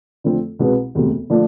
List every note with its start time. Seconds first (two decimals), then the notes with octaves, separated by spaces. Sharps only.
0.24 F2 D3 F3 A3 C4
0.59 C2 B2 G#3 B3
0.95 E1 D2 C3
1.30 D3 F3 A3 D4